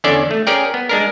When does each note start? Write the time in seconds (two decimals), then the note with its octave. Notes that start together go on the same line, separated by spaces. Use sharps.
0.04 E2 D3 C#4 D4 A4 D5
0.31 A3
0.47 C#4 G#4 A#4 D5 G5
0.74 B3
0.89 G#3 D4 A#4